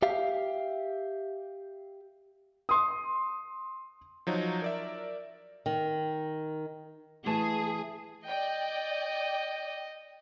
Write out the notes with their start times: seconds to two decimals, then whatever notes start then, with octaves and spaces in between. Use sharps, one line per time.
0.02 G4 E5 F5
2.69 C6 D#6
4.27 F3 F#3 D#4 F#4
4.62 A#4 D5 E5
5.66 D#3
7.26 E3 A3 G#4 A5
8.27 D5 D#5 G5